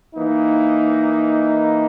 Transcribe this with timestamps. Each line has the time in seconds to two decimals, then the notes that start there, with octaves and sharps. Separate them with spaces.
0.15 E3 A#3 D#4